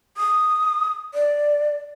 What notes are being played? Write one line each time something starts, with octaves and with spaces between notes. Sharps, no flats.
D#6
D5